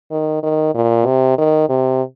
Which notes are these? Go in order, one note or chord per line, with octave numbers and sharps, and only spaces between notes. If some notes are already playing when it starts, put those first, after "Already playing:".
D#3
D#3
A#2
C3
D#3
C3